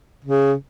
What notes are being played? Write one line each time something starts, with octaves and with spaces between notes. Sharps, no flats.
C#3